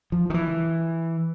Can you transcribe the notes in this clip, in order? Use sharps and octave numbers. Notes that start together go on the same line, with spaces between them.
F3
D#3
E3